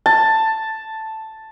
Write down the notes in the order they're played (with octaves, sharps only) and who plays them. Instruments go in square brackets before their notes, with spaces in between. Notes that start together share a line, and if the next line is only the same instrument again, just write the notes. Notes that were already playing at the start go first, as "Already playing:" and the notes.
[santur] A5